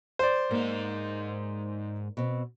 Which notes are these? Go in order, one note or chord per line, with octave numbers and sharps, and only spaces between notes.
C5 D5
G#2 A#3 D#4
B2 C4